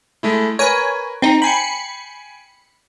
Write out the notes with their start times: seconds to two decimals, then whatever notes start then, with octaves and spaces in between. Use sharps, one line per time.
0.23 G#3 A3 E4
0.59 A#4 B4 C#5 G#5
1.22 C4 D#4 G5 A#5
1.42 G5 G#5 B5 C7 C#7